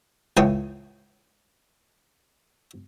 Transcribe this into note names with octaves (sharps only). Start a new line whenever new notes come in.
C#2 A2 E3 C#5 G5 D#6